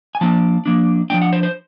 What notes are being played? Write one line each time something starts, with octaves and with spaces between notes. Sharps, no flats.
G#5
F3 A#3 D4 A5
F3 A#3 D4
F3 A#3 D4 G5
F#5
C5
C5